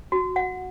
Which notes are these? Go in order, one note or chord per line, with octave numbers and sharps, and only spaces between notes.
F#4
F#5